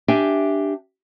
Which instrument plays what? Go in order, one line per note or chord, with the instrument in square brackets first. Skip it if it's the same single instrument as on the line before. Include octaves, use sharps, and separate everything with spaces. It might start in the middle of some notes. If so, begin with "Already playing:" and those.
[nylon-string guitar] D4 G4 E5 G#5